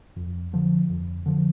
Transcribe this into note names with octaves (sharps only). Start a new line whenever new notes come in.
F2
D3 F3
F2
D3 F3